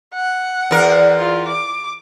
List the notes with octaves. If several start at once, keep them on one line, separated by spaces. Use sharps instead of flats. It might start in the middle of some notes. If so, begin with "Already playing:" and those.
F#5
E2 A#4
F4
D6